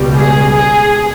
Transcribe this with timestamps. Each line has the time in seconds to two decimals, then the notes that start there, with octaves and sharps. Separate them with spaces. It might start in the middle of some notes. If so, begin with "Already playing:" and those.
Already playing: C#2 B2 G3
0.15 G#4
0.54 G#4